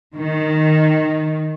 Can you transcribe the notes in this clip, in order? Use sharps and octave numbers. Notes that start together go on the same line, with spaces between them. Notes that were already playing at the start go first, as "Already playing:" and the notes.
D#3